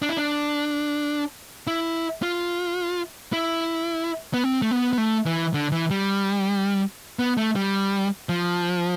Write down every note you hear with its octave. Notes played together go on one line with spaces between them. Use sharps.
D4
E4
D4
E4
F4
E4
B3
C4
A3
B3
B3
A3
E3
D3
E3
G3
B3
A3
G3
F3